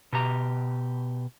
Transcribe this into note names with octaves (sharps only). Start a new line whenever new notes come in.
B2 G4 A#5